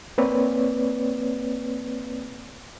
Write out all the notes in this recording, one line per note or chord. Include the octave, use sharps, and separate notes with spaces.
A#3 C4 B4 C#5 D5